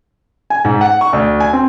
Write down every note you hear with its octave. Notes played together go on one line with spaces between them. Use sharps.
G#5
G#2
F#5
C#6
D2
G#5
C4